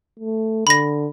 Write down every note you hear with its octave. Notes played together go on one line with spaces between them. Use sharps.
A3
D3 B5 A#6